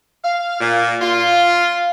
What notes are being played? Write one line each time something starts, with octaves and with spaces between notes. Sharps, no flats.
F5
A#2
F4